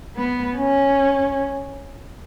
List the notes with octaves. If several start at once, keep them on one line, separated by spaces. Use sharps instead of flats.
B3
C#4